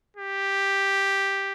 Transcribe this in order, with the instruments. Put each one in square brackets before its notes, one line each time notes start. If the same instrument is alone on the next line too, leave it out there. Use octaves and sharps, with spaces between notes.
[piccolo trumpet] G4